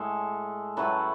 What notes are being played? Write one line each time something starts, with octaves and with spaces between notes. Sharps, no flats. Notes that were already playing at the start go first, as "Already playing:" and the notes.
Already playing: A2 G#3 A4
A2 F#3 A3 B4